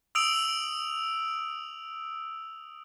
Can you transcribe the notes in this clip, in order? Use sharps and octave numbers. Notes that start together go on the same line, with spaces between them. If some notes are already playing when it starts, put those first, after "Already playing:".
D#6 E6 D7 F7